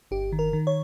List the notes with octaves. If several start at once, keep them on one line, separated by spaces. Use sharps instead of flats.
G1 G4
D#3
A#4
D#3
C#5